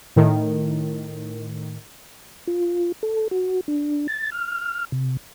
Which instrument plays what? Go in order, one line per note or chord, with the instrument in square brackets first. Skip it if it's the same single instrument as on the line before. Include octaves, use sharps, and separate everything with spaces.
[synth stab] A2 D#3
[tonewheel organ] F4
A4
F#4
D4
A6
F6
C3